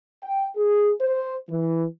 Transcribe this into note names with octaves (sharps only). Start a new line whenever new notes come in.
G5
G#4
C5
E3